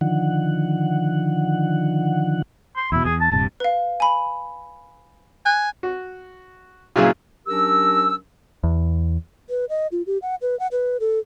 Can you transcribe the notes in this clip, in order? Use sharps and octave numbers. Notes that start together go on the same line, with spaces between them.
D3 D#3 F3 F#5
C6
E2 B2 E4
E2 G#4
A5
D#1 G2 C3 A5
B4 F5
G#5 B5
G#5 F#6
F#4
A#2 C#3 F#3 E4 F4 G#4
F#3 C#4 D4 G4 A#4 E6
E2
B4
D#5
F4
G4
F#5
B4
F#5
B4
A4